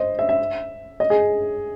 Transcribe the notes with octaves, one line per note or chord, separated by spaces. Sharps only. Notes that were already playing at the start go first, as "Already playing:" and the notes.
Already playing: C5 D#5
E5
E5
D#5
G#4